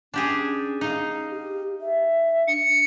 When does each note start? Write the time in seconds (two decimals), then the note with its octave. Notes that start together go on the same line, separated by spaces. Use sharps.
0.14 C#4 D4 G4 G#4
0.81 D#4 F5
1.31 G4
1.81 E5
2.48 D4 C#7